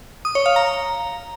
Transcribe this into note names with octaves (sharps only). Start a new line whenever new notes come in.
D#6
C#5
F5
A#5